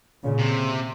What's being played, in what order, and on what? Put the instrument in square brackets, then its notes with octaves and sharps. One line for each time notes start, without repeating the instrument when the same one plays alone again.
[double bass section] A#2 C#3
[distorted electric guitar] C3